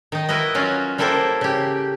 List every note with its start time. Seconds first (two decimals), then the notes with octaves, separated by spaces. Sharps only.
0.12 D#3 D#4
0.28 E4 F#4 A#4 B4 D#5
0.54 F#3 C#4 F4 F#4
0.98 G3 A#3 E4 A4 A#4 C5
1.41 C#3 G4